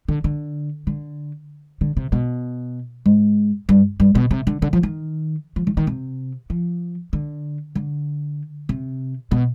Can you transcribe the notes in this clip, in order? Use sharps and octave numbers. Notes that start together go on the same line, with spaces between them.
D3
D3
D3
D3
C3
B2
G#2
G2
G2
B2
C3
D3
D3
F3
D#3
F3
D#3
D#3
C3
F3
D3
D3
C3
B2